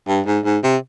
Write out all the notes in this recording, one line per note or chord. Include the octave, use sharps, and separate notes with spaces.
G2
G#2
G#2
C3